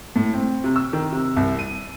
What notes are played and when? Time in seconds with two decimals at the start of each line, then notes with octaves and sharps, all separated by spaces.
0.16 A2
0.34 C4
0.64 C3
0.76 E6
0.93 D#3
1.12 C3
1.36 C2
1.59 D#7